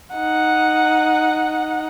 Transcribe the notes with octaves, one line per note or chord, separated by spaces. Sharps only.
D#4 F#5